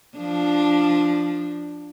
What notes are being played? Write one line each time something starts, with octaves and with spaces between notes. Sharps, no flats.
F3 D4